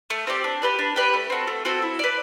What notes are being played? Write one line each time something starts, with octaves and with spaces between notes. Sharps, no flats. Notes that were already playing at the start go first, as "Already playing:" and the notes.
A3
C4 G4 D5
D4
G4 B4 D5
D4
G4 B4 D5
A3
C4 F#4 A4
A3
C4 F#4 A4
E4
B4 D5